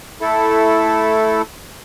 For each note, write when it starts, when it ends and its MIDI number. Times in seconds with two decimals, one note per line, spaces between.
0.21 1.42 57
0.21 1.42 64
0.21 1.42 69